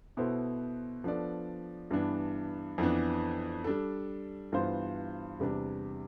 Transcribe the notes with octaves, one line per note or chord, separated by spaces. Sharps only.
B2 B3 E4 A4 C5
F3 B3 D4 A4 D5
G2 E3 B3 D4
F2 E3 B3 D4
G3 D4 A4
G2 E3 B3 F4 C5
E2 C3 G3 D4